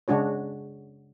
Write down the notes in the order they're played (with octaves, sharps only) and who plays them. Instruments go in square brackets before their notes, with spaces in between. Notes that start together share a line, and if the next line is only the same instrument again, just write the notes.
[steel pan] C#3 G#3 D4 F#4 C#5